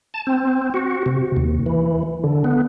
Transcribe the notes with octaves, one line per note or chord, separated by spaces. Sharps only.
A5
C4
F#4
C3
D#2
E3
D3
B3